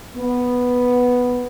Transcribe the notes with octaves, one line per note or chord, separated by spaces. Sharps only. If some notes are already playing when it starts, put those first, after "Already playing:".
B3